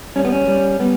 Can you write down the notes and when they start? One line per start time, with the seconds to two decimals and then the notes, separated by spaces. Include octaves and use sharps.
0.16 G3 C#4
0.25 B3
0.32 C#4
0.47 G3
0.79 G3 B3